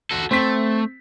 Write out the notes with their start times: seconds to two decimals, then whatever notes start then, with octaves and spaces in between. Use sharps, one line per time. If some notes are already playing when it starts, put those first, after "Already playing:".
0.11 F#4 A4
0.31 A3 C4 B6